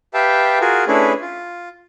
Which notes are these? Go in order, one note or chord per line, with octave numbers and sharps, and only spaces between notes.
G4 B4 E5 F5 G5 A5
F4 F#4 G#4 A#4
A3 C#4 D4 E4 G#4 B4
F4